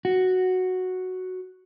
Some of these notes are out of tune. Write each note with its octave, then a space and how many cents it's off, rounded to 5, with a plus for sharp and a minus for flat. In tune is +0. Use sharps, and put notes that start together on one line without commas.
F#4 +0